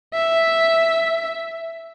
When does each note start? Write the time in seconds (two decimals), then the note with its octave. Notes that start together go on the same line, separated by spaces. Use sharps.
0.14 E5